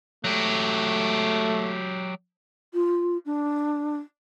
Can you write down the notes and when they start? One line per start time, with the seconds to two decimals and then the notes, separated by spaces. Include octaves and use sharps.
0.24 F#3 A3 G4
2.73 F4
3.25 D4